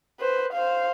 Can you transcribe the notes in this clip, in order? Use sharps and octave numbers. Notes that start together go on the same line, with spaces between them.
B4 C5
C5 F5